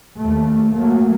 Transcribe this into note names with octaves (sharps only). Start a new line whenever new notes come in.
D#2 A3
F#3 A3 A#3